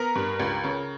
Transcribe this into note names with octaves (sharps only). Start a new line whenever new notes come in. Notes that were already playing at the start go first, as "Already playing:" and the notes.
Already playing: B3 A#4 A#5
G2
C#2
C#3